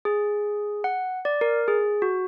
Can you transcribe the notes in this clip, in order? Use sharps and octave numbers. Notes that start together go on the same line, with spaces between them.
G#4
F#5
D5
A#4
G#4
F#4